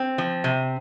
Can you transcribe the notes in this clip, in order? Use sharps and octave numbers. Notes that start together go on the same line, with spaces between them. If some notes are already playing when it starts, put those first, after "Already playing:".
Already playing: C4
F3
C3